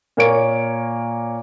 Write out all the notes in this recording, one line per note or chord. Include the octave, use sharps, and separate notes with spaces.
A#2 A#3 C#5 D7